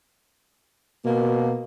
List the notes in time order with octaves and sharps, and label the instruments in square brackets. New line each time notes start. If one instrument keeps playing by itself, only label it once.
[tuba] B2 [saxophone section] A#3